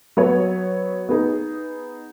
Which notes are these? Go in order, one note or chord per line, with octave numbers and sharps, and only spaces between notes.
F#3 B3 F#4 C#5
B3 D#4 G#4